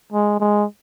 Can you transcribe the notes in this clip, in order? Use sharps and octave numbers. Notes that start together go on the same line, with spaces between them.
G#3
G#3